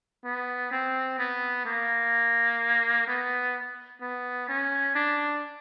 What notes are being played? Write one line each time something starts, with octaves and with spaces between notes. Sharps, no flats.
B3
C4
B3
A#3
B3
B3
C#4
D4